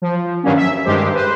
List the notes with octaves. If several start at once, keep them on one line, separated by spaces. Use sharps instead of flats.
F3
G2 D#3 F#3 G3 A#3 C#4
E5
G2 D#3 G#3 G4 C5
B4 C5